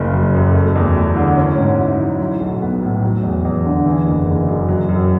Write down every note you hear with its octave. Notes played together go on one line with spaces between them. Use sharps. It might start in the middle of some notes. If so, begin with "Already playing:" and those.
Already playing: F#1 C#3
F#3
F#2
A3
E2
E4
D3
C#4
G#2
E4
F#3
F#3
B1
B3
A2
F#3
E2
E2
D3
E3
F#1
F#1
F#2
F#3
F#2